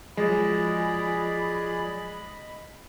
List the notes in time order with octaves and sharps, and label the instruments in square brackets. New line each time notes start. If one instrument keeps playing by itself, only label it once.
[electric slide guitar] F3 F#3 [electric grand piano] G#3 [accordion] G#4 D5 [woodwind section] D#5 B5